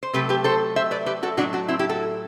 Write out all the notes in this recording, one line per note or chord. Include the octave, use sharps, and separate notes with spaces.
C5
C3 F#3 A3 G4 B4
G4 B4
A4 C5
C5 E5
B4 D5
G4 B4
F#4 A4
A2 F#3 A3 D4 F#4
D4 F#4
C4 E4
E4 G4
F#4 A4